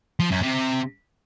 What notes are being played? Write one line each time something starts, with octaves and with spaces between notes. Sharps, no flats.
F3
F#2
C3